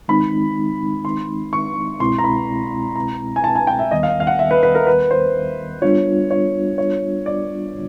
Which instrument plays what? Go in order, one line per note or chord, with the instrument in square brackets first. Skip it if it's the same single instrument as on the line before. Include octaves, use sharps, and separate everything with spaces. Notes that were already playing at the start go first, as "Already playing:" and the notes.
[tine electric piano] D#3 G#3 C4 D#4 [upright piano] B5
[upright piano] C6
C#6
[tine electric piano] C2 B2 G#3 C4 E4 [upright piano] C6
[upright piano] A#5
B5
A#5
G#5
A5
G#5
G5
E5
[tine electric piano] D#2 D#3 G3 B3 [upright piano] D#5
[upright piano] F5
F5
F#5
E5
B4
B4
A#4
B4
C5
[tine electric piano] G3 B3 D4 F4 [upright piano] C#5
[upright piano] C#5
C#5
D5